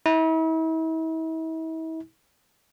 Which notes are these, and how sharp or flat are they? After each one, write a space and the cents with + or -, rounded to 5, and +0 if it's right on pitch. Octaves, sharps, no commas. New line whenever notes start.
E4 -40